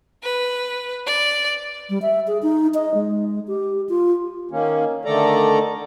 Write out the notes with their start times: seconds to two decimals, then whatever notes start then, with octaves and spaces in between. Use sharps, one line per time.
0.23 B4
1.05 D5
1.90 G3
2.02 E5
2.28 G#4
2.42 D#4
2.74 D#5
2.94 G#3
3.48 G4
3.89 F4
4.51 D#3 A#3 C#4
5.05 D3 D#3 A3 A4 D5 A#5